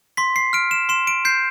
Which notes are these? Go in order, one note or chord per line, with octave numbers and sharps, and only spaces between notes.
C6 B6
C7
F6 D7
E7
C6 E7
D7
G6 C7